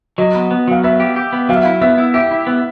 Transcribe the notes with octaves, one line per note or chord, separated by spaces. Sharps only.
F#3 D#5
B3
B3
F#3 F5
B3 E5
G4
G4
B3
F#3 F5
E5
E4 F5
B3 E5
E4
G4 E5
E4
B3